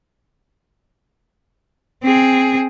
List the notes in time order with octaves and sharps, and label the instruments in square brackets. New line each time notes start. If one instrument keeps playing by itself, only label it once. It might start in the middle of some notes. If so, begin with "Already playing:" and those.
[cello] C4 G#4